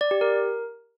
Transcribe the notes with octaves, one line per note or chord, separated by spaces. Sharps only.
D5
G4
A#4